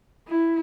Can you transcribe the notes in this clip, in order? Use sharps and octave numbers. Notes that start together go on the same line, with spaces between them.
E4